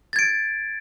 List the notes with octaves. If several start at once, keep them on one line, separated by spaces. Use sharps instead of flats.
G#6 A6 D7